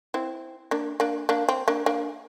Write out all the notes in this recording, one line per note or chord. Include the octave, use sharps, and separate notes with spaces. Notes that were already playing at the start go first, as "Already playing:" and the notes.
C4 E4
A#3 D4
A#3 D4
A#3 D4
C4
A#3 D4
A#3 D4